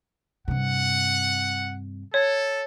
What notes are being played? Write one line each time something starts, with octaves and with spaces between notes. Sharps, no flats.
G2 C3 F#5
A4 C#5